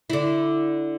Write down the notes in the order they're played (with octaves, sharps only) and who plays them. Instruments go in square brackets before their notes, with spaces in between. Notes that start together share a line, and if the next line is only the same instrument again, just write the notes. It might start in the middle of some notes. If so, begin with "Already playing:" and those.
[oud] D3 E4